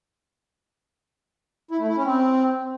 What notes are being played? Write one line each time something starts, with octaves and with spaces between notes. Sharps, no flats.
E4
A3
E4
C#4
C4